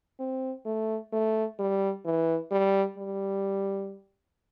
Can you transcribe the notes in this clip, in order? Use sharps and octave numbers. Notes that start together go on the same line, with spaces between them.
C4
A3
A3
G3
E3
G3
G3